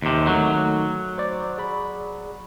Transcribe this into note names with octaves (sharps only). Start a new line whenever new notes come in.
D#2 C3
D#3 F#3 A3 D#4
C5 D5
G#4 D5 B5